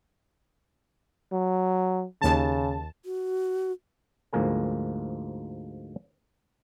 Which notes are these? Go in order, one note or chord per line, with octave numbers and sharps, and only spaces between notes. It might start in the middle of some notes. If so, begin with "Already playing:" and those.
F#3
D#2 C#3 A5
F#4
D2 G#2 F3 A#3 A#4 G#5